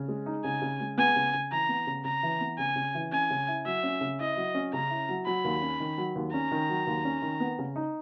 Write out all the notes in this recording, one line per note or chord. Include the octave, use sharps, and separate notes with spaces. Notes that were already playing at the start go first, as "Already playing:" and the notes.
Already playing: C#3
G#3
D#4
C#3 G#5
C#3
G#3
B3 G#5
C#3
C#3
E3 A#5
B3
C#3
C#3 A#5
E3
B3
C#3 G#5
C#3
E3
C#4 G#5
C#3
E4
F#3 E5
C#4
C#3
E4 D#5
F#3
C#4
C#3 A#5
E4
F#3
F#3 B5
D#2
C#4
D#3
F#3
D#2
C#4 A#5
D#3
F#3
D#2
C#4
D#3
B3
C#3
D#4